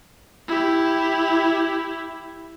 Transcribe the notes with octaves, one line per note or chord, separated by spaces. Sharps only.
E4 G4